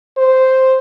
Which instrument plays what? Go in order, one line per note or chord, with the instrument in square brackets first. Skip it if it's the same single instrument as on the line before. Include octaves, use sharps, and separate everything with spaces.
[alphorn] C5